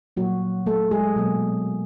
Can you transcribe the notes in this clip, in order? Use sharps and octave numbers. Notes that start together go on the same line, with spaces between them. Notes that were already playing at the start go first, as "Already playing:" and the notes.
A#2 F#3 G3 A#3 F#4
A3 A4
G#3 G#4
B2 F#3 A#3